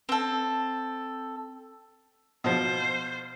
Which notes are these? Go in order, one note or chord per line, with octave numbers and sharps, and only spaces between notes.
C4 A4
B2 F3 C5